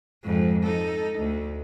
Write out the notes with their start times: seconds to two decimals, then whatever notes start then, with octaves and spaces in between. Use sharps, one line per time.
0.24 F2 G#2
0.63 D#4 A4
1.18 D2